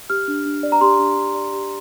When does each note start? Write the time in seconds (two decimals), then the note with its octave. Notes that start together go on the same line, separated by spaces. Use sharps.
0.10 G4 F6
0.28 D4
0.46 D4
0.63 D5
0.72 A#5
0.81 G4 C6
0.99 D4
1.17 D4
1.35 D5
1.53 G4